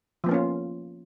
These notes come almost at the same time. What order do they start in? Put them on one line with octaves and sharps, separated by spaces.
F3 B3 A#3 C#4 F4